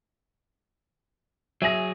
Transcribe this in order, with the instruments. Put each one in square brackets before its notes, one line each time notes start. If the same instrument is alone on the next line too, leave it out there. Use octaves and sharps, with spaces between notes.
[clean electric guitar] F#3 G#4 [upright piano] E5 G#5 A#6